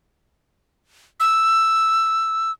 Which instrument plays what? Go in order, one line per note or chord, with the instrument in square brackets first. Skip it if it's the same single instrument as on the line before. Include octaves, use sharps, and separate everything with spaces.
[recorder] E6